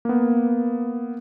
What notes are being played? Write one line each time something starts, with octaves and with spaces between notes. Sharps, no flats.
A#3 B3